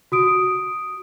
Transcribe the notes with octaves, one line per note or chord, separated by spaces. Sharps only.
F#4 D#6 D7